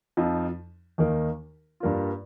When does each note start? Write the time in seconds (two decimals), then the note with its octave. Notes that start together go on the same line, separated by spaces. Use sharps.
0.17 F2 F3 D#4
0.98 D#2 D#3 A#3 D#4
1.80 G2 G3 A#3 F4